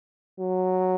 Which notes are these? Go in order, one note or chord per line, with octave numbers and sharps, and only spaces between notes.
F#3